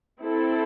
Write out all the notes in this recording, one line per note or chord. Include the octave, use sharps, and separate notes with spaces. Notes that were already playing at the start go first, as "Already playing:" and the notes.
C4 E4 A4